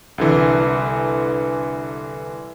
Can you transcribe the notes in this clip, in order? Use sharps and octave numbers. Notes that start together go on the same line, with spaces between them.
C2 D3 E3